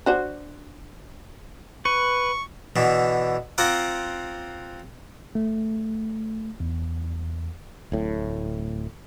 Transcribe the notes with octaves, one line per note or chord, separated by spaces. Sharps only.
D4 F#4 C5
B4 C#6
B2 D3 E3
C4 F4 F#5 A#5 D6
A3
E2
D1 A2